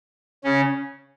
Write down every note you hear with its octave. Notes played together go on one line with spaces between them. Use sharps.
C#3 C#4